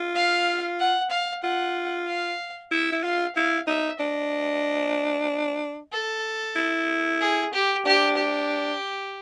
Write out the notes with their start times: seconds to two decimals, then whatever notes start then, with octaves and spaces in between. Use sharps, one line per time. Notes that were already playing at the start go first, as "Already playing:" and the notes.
Already playing: F4
0.15 F5
0.79 F#5
1.10 F5
1.43 F4 F#5
2.07 F5
2.71 E4 E5
2.92 E4
3.03 F4 F5
3.35 E4 F5
3.67 D#4 E5
4.00 D4 D#5
5.92 A4
6.56 E4
7.21 G#4
7.53 G4
7.85 D4 G4
8.17 G4